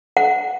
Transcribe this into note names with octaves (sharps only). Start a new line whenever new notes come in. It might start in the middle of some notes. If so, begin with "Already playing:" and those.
F#5